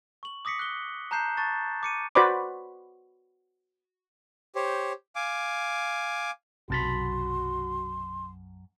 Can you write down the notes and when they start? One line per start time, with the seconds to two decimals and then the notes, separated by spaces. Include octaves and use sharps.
0.23 C#6 F#7
0.45 D6 D#6 A#6 B6 C#7
0.59 F#6 G7
1.11 A5 A#5 F#6 G6 C7 E7
1.37 A5 C#6 F#6 A6
1.83 D6 C#7 D#7
2.15 F#4 B4 C5 D5 B5 D6
4.55 G4 C5 C#5
5.16 F5 G#5 D6
6.70 B1 F#2 C3 F#4 A5 B5 C6